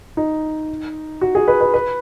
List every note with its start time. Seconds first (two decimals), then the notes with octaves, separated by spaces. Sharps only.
0.17 D#4
1.21 F#4
1.35 G#4
1.48 B4
1.61 B4
1.74 B4